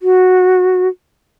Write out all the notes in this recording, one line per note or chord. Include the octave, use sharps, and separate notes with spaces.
F#4